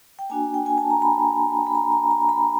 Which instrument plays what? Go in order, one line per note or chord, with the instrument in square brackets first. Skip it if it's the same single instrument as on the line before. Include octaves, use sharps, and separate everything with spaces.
[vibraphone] G5
A#3 D4 F#4 G#5
G5
G#5
A5
A#5
B5
B5
A#5
A#5
A#5
B5